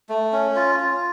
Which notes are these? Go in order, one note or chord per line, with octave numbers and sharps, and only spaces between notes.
A3
C#4
F4
F4